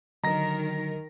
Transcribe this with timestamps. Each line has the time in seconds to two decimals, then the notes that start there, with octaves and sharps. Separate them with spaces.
0.24 D3 D#3 F#3 A#4 D#5 A#5 A#6